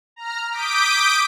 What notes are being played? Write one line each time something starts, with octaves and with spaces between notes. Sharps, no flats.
A#5 F6
D6 D#6 G6 B6 D7